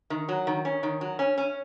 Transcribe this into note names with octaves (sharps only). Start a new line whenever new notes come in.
D#3
F#3
D#3
C#4
D#3
F#3
C#4
C#4